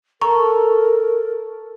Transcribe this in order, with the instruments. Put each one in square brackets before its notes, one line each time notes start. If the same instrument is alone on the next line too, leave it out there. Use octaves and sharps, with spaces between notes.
[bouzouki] A4 [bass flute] A#4 [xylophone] A#5 C#6